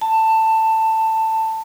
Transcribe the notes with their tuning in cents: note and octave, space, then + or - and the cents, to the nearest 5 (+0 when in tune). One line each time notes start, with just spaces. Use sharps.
A5 +15